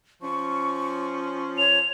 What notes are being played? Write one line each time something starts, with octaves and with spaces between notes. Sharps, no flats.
F3 C#4 C#6
C#5 F7